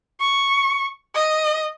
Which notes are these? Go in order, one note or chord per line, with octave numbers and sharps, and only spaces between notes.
C#6
D#5